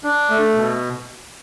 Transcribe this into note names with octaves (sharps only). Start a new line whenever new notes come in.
D4
A3
B2